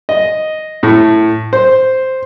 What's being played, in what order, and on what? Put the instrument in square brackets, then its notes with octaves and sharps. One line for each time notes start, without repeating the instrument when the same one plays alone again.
[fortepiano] D#5
A2
C5